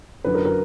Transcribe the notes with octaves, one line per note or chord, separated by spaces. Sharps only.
F#2 D3 F#3 B4
A#4
A#4